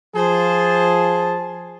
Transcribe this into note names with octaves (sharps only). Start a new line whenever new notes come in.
F3 G#4 C5 A5